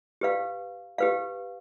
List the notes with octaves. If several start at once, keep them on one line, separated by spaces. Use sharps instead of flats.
G4 B4 F5
G4 B4 F5